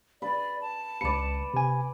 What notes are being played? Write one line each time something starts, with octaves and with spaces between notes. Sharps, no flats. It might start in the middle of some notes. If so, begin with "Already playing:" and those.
B4 D5
A5
C#2 B4 D5 C#7
C3 G#5